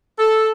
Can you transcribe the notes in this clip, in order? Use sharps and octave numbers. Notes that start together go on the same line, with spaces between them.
A4